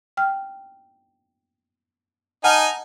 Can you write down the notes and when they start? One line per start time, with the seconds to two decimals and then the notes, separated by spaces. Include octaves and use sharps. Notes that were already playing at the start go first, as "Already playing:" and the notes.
0.17 G5 F6
2.44 D#4 F#5 G#5 A5 F6